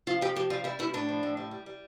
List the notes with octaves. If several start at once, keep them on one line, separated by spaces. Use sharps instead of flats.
F3 F4
F3 G4
F3 G4
G3 F4
G3 E4
B2 E4
A2 D4
F3
A2
G3
G3
G3